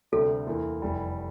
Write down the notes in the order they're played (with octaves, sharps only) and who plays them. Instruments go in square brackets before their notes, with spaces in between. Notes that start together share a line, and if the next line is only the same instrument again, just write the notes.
[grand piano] D2 C3 G3 D4 F4 [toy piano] A4
[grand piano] E2 E3 A#3 F4
F1 E2 E3 G3